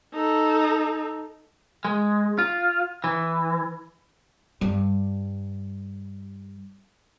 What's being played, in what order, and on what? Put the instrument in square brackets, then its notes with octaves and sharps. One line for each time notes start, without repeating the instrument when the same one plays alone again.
[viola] D#4 A4
[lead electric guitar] G#3
F4
E3
[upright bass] G2 G3